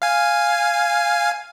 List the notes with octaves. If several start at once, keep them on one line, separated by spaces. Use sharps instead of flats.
F5 G#5